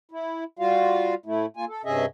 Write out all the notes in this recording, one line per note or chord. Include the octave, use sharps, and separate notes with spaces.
E4
G3 F4 F#4 F5
A2 A3 E4
A#3 F4 G#5
A4
G2 C3 C#4 G#4 D#5 E5